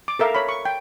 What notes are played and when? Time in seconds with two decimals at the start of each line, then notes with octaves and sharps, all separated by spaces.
0.08 D6
0.19 A4 A#4 E5 F5
0.35 C#5 B5
0.49 C#6
0.65 G5